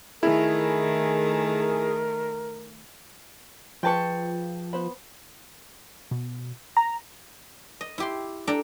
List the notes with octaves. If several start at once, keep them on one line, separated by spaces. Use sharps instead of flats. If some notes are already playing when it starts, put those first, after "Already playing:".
D#3 A3 E4 G#4 A#4
F3 F4 G#4 B4 G5 A5 C#6
B3 C5 B5
B2
A#5
D#5
E4 G4 C6
D4 A4 G5 A#5